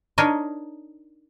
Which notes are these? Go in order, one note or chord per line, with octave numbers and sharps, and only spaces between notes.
D4 D#4 A#4 C#5 D#5